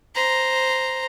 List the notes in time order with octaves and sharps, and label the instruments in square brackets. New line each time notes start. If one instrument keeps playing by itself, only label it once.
[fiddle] C5 A#5